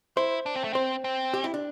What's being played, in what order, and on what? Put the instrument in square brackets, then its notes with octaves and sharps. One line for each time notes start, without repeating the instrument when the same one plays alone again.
[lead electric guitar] E4 [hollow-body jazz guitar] C5
[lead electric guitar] D4
C4
A3
[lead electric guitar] C4 [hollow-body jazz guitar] C5
[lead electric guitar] C4
[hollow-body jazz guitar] G4
E4
D4